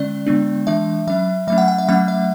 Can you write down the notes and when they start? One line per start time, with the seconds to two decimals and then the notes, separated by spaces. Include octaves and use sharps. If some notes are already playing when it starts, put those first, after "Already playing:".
Already playing: D3 G#3 C#4 D5
0.27 D3 G#3 B3 D4
0.67 E3 G#3 D4 E5
1.07 F#3 C#4 E5
1.47 F#3 A3 C#4 E5
1.58 F#5
1.68 F#5
1.78 E5
1.88 F#3 A3 C#4 F#5
2.08 E5